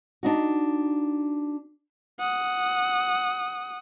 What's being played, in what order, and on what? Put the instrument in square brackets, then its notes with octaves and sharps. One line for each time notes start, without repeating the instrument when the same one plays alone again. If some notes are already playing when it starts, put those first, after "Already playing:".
[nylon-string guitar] D4 D#4 F#4
[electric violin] F#5 D#6